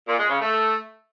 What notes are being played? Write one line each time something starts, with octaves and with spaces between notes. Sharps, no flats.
A#2
G#3
C#3
A3